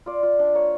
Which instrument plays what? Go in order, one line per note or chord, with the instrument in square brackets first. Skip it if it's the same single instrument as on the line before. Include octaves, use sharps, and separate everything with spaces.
[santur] F4 D5
F4
D4
A#3 C#5